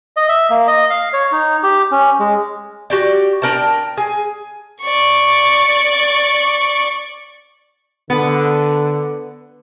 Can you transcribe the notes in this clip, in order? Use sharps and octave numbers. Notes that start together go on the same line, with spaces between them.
D#5
E5
A#3
D#5
F5
C#5
D#4
G4
C#4
G#3
F#4 G4 D5
D4 A#4 G5 A5
G#4
D5 C#6
D3 B3